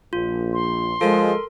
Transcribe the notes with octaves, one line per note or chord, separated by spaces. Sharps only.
A#1 F4
C6
F3 G#3 A4 A#4